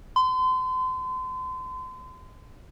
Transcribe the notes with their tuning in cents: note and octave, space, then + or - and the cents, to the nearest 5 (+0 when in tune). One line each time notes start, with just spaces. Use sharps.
C6 -35